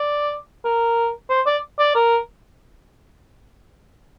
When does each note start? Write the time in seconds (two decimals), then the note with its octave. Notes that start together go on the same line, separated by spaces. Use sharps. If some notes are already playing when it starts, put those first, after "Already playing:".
Already playing: D5
0.65 A#4
1.30 C5
1.46 D5
1.79 D5
1.95 A#4